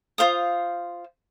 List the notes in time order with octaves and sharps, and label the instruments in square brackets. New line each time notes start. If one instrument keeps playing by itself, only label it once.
[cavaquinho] F4 C5 F5 D#6